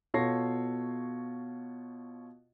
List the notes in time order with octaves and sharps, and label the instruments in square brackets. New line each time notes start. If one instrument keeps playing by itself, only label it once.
[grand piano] B2 F4 A4 C#5 A#6 C7